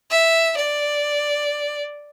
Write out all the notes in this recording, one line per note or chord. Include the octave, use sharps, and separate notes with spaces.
E5
D5